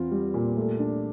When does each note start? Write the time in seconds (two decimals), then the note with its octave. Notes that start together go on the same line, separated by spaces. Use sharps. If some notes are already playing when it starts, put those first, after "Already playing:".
Already playing: E2 C4 F4
0.11 G3
0.34 A#2
0.57 A3
0.79 D4